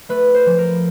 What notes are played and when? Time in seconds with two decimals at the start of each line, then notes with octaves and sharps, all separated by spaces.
0.09 A3 B4
0.34 C5
0.46 F3
0.58 A#4